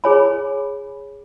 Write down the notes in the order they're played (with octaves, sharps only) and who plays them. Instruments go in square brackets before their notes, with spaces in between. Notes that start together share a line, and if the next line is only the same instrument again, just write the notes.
[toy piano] G#4 C#5 G#5 B5